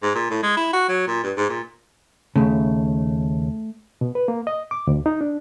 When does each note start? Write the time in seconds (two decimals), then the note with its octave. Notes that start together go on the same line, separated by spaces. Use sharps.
0.03 G#2
0.15 A#2
0.30 A2
0.43 G#3
0.57 E4
0.73 F#4
0.89 F#3
1.07 A#2
1.23 G2
1.37 G#2
1.49 A#2
2.36 D#2 C#3 A3
4.01 B2
4.15 B4
4.28 A#3
4.47 D#5
4.71 D6
4.87 D2
5.06 D#4
5.21 D4